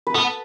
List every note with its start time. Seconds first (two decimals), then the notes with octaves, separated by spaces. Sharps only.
0.07 B4
0.15 B3 A4